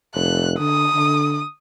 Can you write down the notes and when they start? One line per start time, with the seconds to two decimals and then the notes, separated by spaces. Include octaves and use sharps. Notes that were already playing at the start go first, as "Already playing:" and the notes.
0.15 F1 F#6
0.59 D3 D#6
0.94 D3